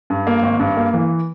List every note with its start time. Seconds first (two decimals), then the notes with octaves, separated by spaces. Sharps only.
0.10 G2
0.27 A#3
0.43 G#1
0.59 G2
0.77 A#3
0.94 E3